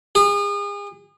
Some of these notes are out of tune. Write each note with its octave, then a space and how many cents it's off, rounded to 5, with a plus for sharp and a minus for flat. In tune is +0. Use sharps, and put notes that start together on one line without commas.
G#4 -35